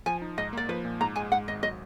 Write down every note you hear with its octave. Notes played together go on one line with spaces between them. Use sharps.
F3 G#5
D#4
G#2 D#5
A#3 D5
F3 B4
A#2
G#2 A#5
G#3 G#5
G#2 F#5
G#1 D#5
F#3 D#5